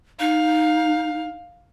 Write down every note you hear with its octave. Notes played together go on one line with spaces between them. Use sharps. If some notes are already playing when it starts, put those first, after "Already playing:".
D#4 F5